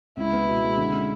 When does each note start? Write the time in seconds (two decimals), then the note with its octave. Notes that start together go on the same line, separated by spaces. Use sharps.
0.17 C#2 E4
0.33 B3
0.48 B2
0.63 G#3
0.77 D3
0.93 C#4